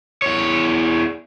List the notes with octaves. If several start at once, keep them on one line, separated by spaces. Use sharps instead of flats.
E2 C#5